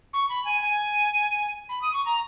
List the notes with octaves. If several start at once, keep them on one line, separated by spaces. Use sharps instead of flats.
C#6
B5
G#5
G#5
B5
D#6
C#6
A#5